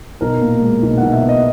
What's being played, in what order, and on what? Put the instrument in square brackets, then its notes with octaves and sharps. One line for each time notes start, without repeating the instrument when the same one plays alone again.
[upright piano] B1 A#4
A#2
G#3
B1
B1 F#5
E5
B3
D#5